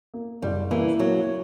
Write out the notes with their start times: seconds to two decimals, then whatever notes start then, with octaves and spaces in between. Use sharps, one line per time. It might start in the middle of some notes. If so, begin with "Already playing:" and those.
0.14 A#3
0.42 F#1 G3
0.71 E3 A#3
0.99 F#3 A#3